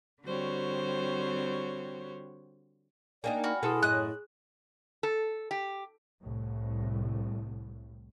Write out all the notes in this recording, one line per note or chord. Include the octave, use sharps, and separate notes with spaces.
D3 G3 C4 F#4 C5 C#5
A#3 D4 D#4 D5 G5 G#5
F#4 G#5 B5 F6
B2 E4 G#4 A4 G#5 C6 D#6
F#2 A2 G#4 D#5 F#6
A4
G4
C2 A2